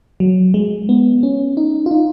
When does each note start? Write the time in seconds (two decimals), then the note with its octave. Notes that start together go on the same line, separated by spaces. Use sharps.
0.20 F#3
0.54 G#3
0.89 B3
1.23 C#4
1.57 D#4
1.86 F4
1.91 D#4